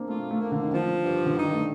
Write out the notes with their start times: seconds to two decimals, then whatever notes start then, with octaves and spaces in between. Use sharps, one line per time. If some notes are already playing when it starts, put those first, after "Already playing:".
Already playing: A#3 C4 D4
0.08 A3 F4
0.31 A3
0.41 A#3
0.52 D3
0.63 D#3
0.72 D3 F3
1.04 G2
1.26 D3
1.36 D#3 D#4
1.53 A3